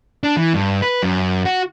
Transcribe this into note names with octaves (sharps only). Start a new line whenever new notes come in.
D4
E3
G2
B4
F#2
F#4